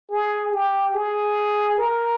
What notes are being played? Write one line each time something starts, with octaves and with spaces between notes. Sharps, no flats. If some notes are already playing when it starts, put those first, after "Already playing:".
G#4
G4
G#4
A#4